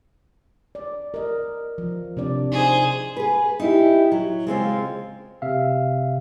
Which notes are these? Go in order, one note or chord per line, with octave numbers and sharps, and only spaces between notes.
D5
A#4 D#5
F3
C3 D4 D5
D#4 G#4 C5
G#4 B4
D#4 E4 G4
F#3
C#3 G#3 C4 F4
C3 E5 F5